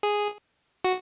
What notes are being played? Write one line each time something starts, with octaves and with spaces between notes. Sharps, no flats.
G#4
F#4